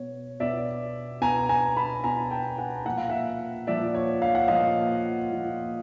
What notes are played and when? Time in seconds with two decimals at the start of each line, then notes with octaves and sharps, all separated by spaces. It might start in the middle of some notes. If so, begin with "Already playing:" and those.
Already playing: B2 C#5
0.40 B2 D5 E5
1.21 B2 G#5 A#5
1.49 G#5 A#5
1.77 A5 B5
2.04 B2 G#5 A#5
2.31 G5 A5
2.58 F#5 G#5
2.85 A#2 F3 F#5
2.98 F5
3.10 E5 F#5
3.67 A#2 F3 D5 E5
3.95 C#5
4.22 F5
4.35 F#5
4.48 A#2 F3 D#5 F5
5.31 A#2 F3